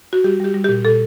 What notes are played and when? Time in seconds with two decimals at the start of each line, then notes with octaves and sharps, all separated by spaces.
0.13 F#4
0.24 G3 G4
0.40 G3 G4
0.54 G3
0.64 G4
0.69 A#2
0.84 A#2 A4